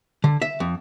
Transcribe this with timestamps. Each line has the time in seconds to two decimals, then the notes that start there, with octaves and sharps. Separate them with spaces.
0.24 D3
0.42 E5
0.60 F2